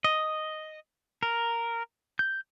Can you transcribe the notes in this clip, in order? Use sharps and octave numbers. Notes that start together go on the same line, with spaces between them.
D#5
A#4
G6